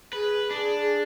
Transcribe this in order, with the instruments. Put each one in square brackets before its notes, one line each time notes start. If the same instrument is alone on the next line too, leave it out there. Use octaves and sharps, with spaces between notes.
[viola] G#4 [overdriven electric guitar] B4
[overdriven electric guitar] D4 [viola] G#4